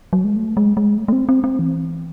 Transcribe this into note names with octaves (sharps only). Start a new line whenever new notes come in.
F#3
G#3
A3
G#3
G#3
A3
A3
C4
C4
C4
E3